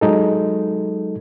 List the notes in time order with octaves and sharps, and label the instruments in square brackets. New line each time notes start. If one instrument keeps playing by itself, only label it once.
[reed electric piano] F#3 G#3 D#4 A4